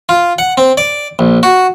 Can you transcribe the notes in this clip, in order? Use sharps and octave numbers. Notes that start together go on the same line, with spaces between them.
F4
F#5
C4
D5
A#1
F#4